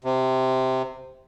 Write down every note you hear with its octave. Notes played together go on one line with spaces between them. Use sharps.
C3